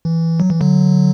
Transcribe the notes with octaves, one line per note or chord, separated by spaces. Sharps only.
E3
F#3
E3
D3 F#3